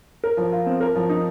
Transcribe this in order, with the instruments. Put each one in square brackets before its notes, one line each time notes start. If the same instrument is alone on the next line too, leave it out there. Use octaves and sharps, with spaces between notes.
[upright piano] A#4
F3
F4
C4
A#4
F3
D#4